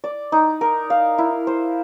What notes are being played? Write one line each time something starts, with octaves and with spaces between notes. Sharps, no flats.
D5
D#4
A#4
F5
E4
C5